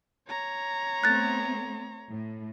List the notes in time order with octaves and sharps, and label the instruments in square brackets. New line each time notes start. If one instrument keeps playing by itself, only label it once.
[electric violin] C#5 A#5
[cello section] A3 B3 C4 [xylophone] F#6 A6
[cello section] A2